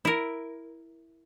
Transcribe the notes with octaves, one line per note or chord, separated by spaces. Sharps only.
E4 A#4